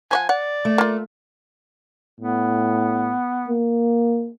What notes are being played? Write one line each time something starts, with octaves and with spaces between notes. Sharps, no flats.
F3 C#5 F#5 G#5
D5 F#5
A3
A#3 F4
A2 B3
A#3